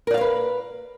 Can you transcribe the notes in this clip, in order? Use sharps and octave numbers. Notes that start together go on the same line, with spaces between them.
A#4 B4 C#5 D5 F5